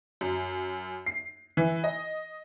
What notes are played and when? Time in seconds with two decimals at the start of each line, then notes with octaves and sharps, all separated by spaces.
0.21 F#2
1.06 C7
1.57 E3
1.84 D#5